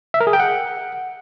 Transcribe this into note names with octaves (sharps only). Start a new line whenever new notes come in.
E5
A#4
G#4
G5
F#5